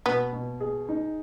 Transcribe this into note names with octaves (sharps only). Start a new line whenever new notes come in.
B2 B3
B2
G#4
D#4